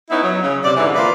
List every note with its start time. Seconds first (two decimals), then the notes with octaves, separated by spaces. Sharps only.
0.10 B3 C#4 D#4 E4
0.23 F#3
0.43 C#3
0.65 C3 D5
0.77 G#2 D3 E3
0.95 F3 A#3 F4 B4 D5